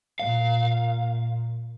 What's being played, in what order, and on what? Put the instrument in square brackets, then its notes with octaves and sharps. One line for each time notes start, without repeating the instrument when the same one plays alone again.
[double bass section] A#2 [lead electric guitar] F5